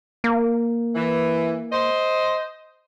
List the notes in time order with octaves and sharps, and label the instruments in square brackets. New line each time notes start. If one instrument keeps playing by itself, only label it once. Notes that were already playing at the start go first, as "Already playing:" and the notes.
[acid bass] A#3
[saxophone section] E3
C5 D#5